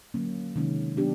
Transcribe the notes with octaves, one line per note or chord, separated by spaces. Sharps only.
D3 F#3 A#3 C#4
C3 D#3 G#3 C#4
F#3 B3 D4 G4